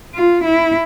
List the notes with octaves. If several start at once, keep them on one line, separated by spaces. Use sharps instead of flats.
F4
E4